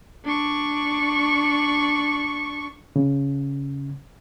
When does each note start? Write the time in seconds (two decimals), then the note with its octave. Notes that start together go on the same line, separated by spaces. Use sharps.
0.25 D4 C#6
2.96 C#3